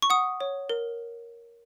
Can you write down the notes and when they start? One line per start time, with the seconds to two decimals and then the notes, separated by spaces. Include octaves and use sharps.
0.02 C#6
0.10 F#5 D#6
0.41 C#5
0.69 A#4